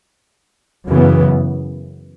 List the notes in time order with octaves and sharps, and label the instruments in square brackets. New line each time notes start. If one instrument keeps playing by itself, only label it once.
[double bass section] F#2 C#3 E3 B3